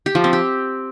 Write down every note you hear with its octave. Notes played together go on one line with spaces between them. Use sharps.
G4
F3
C4
G4